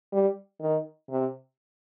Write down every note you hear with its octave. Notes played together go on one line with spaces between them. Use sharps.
G3
D#3
C3